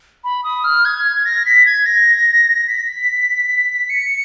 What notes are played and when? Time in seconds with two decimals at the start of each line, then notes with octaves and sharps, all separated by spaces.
0.24 B5
0.44 D#6
0.64 F6
0.85 G#6
1.05 G#6
1.26 A#6
1.46 B6
1.66 G#6
1.86 A#6
2.67 B6
3.90 C#7